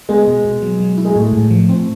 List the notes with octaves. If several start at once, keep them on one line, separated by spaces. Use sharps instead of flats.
G#3 B3
B2
B2
F#3
F#3
E4
G#3
A2 A3
A2
F3
C4